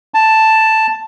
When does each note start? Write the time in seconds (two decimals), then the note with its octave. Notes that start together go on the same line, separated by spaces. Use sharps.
0.14 A5